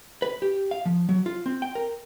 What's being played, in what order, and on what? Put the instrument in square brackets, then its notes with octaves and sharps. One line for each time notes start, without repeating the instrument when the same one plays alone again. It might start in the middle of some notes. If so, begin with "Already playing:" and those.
[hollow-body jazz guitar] B4
G4
F5
F3
F#3
F4
C4
G5
A#4